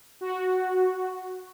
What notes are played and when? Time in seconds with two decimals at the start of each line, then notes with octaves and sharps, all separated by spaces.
0.21 F#4